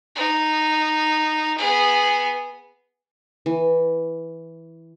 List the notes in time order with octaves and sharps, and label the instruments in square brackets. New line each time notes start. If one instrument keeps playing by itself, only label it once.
[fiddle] D#4
B3 G#4
[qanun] E3